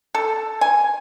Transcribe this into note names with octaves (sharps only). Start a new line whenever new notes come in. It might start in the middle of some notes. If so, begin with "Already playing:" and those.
A4
G#5